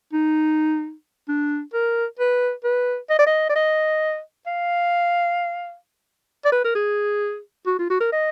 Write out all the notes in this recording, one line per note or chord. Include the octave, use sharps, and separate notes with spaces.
D#4
D4
A#4
B4
B4
D#5
D5
D#5
D5
D#5
F5
D5
B4
A#4
G#4
F#4
F4
F#4
A#4
D#5